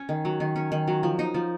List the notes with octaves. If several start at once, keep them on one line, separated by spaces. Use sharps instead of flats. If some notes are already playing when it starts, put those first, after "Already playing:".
Already playing: C#4
D#3
F#3
D#3
C#4
D#3
F#3
F3
D#4
F3